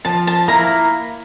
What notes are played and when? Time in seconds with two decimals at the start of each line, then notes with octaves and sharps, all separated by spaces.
0.05 F3 A5
0.27 A5
0.48 A#3 E4 A#4 A#5